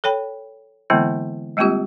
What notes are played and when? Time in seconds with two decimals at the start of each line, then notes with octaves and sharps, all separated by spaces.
0.04 A4 C#5 G5 B5
0.90 D3 E3 G#3 A#3 B3 E4
1.57 G3 G#3 A#3 C4 F4 G4